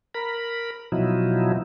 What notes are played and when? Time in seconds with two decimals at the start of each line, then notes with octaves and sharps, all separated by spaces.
0.15 A#4 B5
0.92 B2 F3 F#3 D#4 E4